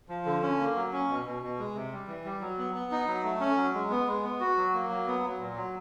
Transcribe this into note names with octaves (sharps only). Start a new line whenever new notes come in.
F3
D3
C#4
A#3
F#3
C#4
B2
B2
B2
G#3
C3
G3
E3
G3
F#3
B3
B3
D#4
F#3
A3
C#4
F#3
G#3
B3
G#3
B3
F#4
F#3
A#3
F#3
B3
F#3
A#2
F#3